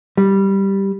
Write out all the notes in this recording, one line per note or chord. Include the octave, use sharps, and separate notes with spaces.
G3